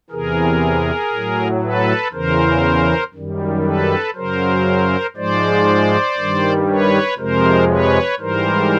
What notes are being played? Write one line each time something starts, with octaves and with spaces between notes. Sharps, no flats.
E2 C3 E3 G#4 A#4
A2 F#3
A4 B4
E2 C#3 E3 A#4 C5
F#2 D#3 G3
A4 B4
F#2 C#3 F#3 A#4 C5
G#2 F3 G#3 C5 D5
G2 D#3 G3
B4 C#5
F2 C3 F3 G#3 A#4 C5
B4 C#5
G#2 E3 G3 A#4 C5